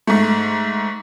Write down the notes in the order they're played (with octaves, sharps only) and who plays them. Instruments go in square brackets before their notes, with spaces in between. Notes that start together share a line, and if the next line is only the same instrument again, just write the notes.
[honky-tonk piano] G#2 A3